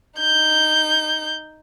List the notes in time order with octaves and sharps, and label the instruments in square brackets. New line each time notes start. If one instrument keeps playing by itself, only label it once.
[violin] D#4 G6